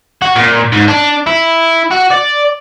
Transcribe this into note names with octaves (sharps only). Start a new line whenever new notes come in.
F#4
A#2
G#2
D4
E4
F#4
D5